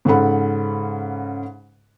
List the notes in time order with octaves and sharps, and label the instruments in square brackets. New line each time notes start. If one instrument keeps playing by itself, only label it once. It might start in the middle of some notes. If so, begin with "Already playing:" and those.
[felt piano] G#2 C#3 C#4 A4 F#5 B5